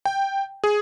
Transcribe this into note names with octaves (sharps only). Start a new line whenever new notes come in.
G5
G#4